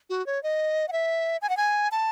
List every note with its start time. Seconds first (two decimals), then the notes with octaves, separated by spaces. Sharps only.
0.10 F#4
0.26 C#5
0.43 D#5
0.88 F#5
0.92 E5
1.42 G#5
1.49 F#5
1.57 G#5
1.92 A5